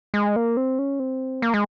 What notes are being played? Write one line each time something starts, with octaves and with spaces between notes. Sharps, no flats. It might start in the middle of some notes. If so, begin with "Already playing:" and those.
G#3
A#3
C4
C#4
C4
A#3
G#3